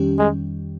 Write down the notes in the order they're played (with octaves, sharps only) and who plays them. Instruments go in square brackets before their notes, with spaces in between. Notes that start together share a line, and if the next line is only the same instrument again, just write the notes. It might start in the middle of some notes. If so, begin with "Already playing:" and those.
Already playing: [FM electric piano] F2 D#3 G3 C#4 G4
[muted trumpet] G#3